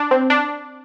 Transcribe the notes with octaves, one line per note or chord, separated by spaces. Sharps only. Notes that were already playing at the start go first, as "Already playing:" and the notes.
Already playing: D4
C4
D4